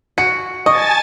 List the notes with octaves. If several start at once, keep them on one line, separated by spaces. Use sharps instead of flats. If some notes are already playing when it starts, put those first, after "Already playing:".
F#4 C#7
D#5 G#5 A5 C#6 A6